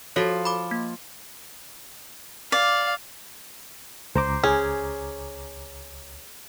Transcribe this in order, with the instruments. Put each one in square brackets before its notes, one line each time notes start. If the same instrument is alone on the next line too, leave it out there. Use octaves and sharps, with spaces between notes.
[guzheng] F3 F4 [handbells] F#4 A4 C#5
[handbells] B5 D6
A#3
[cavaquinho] D5 [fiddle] F5
[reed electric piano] C#2 A#5 D6 [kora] C5
[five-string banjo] C#4 [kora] G#4